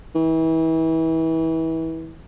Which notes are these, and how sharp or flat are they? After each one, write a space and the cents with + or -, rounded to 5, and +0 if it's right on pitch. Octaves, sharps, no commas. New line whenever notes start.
E3 -30